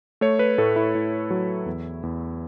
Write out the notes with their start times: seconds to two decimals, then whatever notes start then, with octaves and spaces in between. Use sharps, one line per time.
0.21 A3 C#5
0.39 B4
0.58 A2 A4
0.76 E4
0.95 A2
1.31 F#3
1.66 E2
2.03 E2